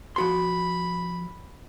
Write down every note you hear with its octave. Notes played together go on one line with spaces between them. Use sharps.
F3 F#4 B5 C6